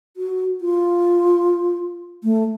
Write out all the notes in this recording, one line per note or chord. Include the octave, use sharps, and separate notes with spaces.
F#4
F4
A3